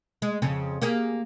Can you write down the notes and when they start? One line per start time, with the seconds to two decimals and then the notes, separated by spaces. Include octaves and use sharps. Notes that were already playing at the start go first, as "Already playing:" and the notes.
0.22 G#3
0.42 F2 C#3 C4
0.82 A#3 G4 G#4